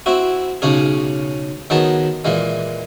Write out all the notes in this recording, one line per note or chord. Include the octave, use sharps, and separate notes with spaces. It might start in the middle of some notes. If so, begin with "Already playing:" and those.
C4 E4 F#4
B1 C#3 C#4 G#4
D#3 F#3 B3 G#4 A5
A#2 E3 G#3